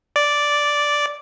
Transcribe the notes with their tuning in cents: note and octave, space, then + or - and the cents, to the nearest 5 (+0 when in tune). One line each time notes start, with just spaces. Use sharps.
D5 -5